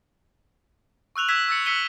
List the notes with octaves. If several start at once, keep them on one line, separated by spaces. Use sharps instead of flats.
C#6 E6 F#6 F7 F#7
E6 F#6 G#6 B6 E7
E6 A6 C#7
E6 F#6 B6 C#7 D#7 G7